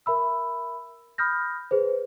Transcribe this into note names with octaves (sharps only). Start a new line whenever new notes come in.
A#4 E5 B5 E6
B5 D#6 F6 G6 A#6
G#4 B4 C5